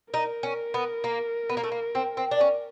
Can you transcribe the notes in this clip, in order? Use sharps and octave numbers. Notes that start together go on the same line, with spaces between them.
D#4 A#4
C#4
B3
A#3
B3
A#3
A3
A#3
C4
C4
D4
C#4